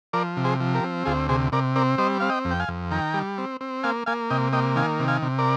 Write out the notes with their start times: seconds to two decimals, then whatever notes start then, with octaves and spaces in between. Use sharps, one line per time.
0.13 F3 A#4 D5
0.37 C3
0.44 G#4 C5
0.60 F3
0.75 G4 A#4
0.84 C4
1.05 D2 F4 G#4
1.29 C3 G#4 C5
1.52 C3 A#4 D5
1.76 C4 A#4 D5
1.98 G3 C5 D#5
2.20 C4 F5
2.30 D#5 G5
2.45 F2
2.51 G5
2.60 F5 G#5
2.68 F2
2.91 D#3 G5 A#5
3.14 G3
3.38 C4
3.61 C4
3.83 A#3 F5 G#5
4.06 A#3 F5 G#5
4.30 C3 D#5 G5
4.53 A#3 D#5 G5
4.76 D#3 F5 G#5
5.00 C3
5.08 F5 G#5
5.22 C3
5.38 A#4 D5